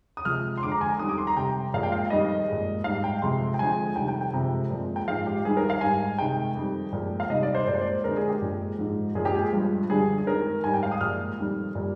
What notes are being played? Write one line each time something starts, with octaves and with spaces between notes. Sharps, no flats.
D#6
C3 F3 G#3 F6
C6
F2 D3 G#3 D6
A#5
G#5
F2 D#3 G3 D#6
D6
C6
A#5
C3 G3 G5
A#2 F3 G#3 F5
G5
F5
F2 D#3 G3 D#5
A#2 G#3
G#2 G3 F5
G5
F2 C3 F3 G#3 C6
G5
F2 D3 F3 G#3 G#5
F2 C3 D#3 G3 G5
G5
G5
F2 C3 F3 G#3
A#2 F3 G#3
G5
G#2 F3 G#3 F5
G4
G2 D#3 G3 G#4
A#4
F5
G#2 G3 G#5
C3 D#3 G#3 G5
F2 D#3 G3
A#2 F3 G#3
F5
C3 D#3 G3 D#5
D5
C5
A#2 G#3 D5
C5
D5
F2 D3 G#3 A#4
G#4
G4
A#2 F3 G#3
G#2 F3 G#3
A#2 F3 G#3 G#4
G4
G#4
G2 F3 G#3
G2 D3 G3 G#4
G#4
F2 D#3 G#3 A#4
G#2 G3 G#5
G5
F5
D#6
A#2 F3 G#3 F6
F2 D#3 G3
A#2 G3